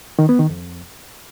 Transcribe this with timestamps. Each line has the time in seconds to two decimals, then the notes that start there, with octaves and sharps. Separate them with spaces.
0.19 D#3
0.29 B3
0.39 D#3
0.50 F2